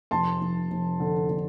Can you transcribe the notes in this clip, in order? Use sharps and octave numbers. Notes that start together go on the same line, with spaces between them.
F1 A5 C6
F1
F1
D3
D3